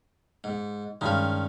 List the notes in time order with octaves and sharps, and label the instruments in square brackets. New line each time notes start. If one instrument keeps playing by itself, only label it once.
[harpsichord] G#2
[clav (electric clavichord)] G2 D#3 G#3 [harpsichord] C#4 E5 F5